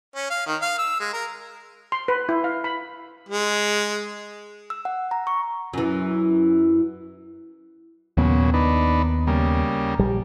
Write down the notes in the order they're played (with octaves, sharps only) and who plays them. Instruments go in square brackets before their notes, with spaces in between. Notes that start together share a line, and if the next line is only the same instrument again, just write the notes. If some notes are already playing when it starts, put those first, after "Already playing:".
[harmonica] C#4
F5
D#3
F5
E6
G#3
A#4
[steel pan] C6
B4
E4
F5
B5
[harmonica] G#3
[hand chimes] E6
F#5
A#5
C#6
[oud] F#2 E3
[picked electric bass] D#2 B3 [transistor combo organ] A#2 C#3 F#3
[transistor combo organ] D4 D#4 B4
C#3 G3 A#3
[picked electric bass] A#1 G3